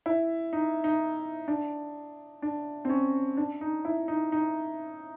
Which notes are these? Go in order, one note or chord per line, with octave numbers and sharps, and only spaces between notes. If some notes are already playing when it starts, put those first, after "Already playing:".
E4
D#4
D#4
D4
D4
C4
C#4
D4
D#4
E4
D#4
D#4